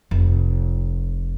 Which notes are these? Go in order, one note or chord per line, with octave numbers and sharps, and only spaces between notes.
F1